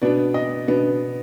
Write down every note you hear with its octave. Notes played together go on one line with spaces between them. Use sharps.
B2 B3 D4 D5
D#5
B2 B3 D4